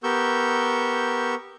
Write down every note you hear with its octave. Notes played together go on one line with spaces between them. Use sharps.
B3 G4 A#4 C#6 E6 G6